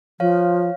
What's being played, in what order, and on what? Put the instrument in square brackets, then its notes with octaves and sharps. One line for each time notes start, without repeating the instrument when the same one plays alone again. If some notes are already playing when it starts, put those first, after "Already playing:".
[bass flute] F3 [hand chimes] C#5 F5